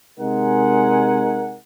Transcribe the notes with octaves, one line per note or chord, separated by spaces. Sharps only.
C3 G#3 D#4 A#4 F#5 G#5